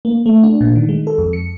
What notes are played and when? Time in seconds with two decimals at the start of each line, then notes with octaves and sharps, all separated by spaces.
0.05 A#3
0.26 A3
0.43 D4
0.61 A#2
0.76 D#3
0.89 G#3
1.07 A4
1.18 F2
1.33 C#7